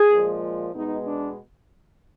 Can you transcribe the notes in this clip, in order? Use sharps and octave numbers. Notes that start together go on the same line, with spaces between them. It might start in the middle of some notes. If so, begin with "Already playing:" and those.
Already playing: G#4
A#2 F3 G#3
B2 G#3 B3 D#4
D4